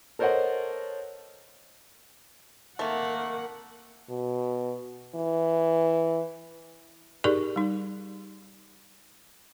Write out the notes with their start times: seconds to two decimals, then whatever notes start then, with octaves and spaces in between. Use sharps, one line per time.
0.19 A4 A#4 C5 C#5 D#5 F#5
2.79 D#3 A3 A#3 C4 F#5
4.09 B2
5.15 E3
7.24 D#4 G4 G#4 A#4 D5 C#6
7.56 G3 D#4